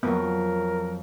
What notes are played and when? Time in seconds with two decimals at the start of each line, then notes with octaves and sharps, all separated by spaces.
0.03 F2 F#3 A#3 B3 A#4